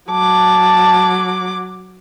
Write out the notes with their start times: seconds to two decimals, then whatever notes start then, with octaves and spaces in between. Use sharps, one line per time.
0.11 F#3 A5 D6